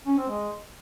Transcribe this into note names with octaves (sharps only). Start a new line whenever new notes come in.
C#4
C4
G#3